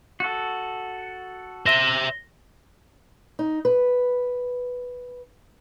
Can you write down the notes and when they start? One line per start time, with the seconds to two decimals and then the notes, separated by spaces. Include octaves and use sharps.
0.20 F#4 A4
1.66 C5 E5 A#6 G7
3.39 D#4
3.65 B4